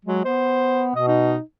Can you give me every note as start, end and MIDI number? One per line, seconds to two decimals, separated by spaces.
0.05 0.23 54
0.05 0.21 56
0.25 0.95 59
0.25 0.86 72
0.96 1.35 47
0.96 1.06 75
1.07 1.41 63